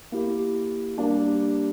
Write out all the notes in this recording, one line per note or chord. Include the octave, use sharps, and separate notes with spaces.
A#3 E4 G4
G3 A#3 D4 G4